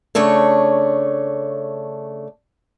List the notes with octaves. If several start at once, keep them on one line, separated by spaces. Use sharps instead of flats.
C#3 A3 D4 C#5